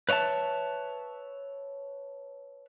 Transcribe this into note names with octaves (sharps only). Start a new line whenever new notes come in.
B4 C#5 D#5 E5 A5